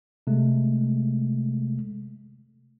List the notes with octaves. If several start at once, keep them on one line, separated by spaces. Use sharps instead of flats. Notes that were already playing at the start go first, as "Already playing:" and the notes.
C3 G#3 A3